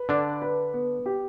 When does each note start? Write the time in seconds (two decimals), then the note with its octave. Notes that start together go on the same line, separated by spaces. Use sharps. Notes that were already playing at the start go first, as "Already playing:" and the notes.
Already playing: B4
0.09 D3 D4 D5
0.42 B4
0.73 B3
1.06 G4